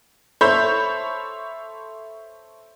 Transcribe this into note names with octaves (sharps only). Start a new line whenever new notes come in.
A4 C5 C#5 E5 B5 G6